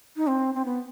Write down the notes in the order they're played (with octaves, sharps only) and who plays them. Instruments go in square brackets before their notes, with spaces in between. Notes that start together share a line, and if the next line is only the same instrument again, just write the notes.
[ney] D#4
C4
C4
B3